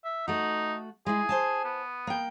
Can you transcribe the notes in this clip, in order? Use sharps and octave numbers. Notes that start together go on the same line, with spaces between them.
E5
A3 D#4 F#4
G#3 E4 G#4
C5 G#5 A5
B3
A#3 G5